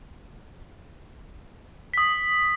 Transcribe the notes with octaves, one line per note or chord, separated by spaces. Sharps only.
D#6 B6